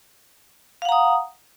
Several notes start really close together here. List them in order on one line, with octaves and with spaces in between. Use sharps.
F5 F#5 A#5 D#6